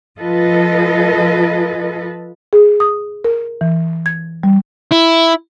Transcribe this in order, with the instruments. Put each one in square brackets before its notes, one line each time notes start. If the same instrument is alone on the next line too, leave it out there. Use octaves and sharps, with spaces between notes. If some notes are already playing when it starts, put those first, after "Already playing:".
[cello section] F3 F4 A4 B4 D#5
[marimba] G#4
D#6
A#4
E3
G#6
G3
[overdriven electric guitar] E4